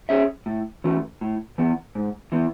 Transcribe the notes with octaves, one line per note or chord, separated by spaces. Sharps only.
C#4 G#4 C#5 E5
A2
E3 A3 C#4 F#4
A2
E3 B3
G#2
E3 B3